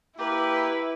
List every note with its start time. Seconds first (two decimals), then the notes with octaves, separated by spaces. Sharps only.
0.18 A#3 E4 G4 B4